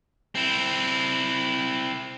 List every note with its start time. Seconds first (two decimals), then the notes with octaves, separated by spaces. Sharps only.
0.35 C4 E4